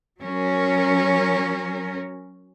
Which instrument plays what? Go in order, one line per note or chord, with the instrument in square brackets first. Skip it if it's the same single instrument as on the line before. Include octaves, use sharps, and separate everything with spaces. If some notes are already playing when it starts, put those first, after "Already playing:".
[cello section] F#3 C#4 A#4